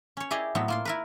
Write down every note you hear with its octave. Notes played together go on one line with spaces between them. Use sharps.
C#4 C#5
E4 G4 G#4 D5 D#5
A2 F#3 B3 C4
A#3 F4 C6
E4 A#4 B4